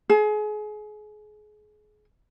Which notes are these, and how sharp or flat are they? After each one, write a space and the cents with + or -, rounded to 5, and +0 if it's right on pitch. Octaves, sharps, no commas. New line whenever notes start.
G#4 +30